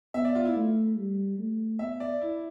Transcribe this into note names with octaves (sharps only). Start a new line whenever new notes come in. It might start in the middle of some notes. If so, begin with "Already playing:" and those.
B3 E5
D5
F4
E4
A3
G3
A3
B3 E5
D5
E4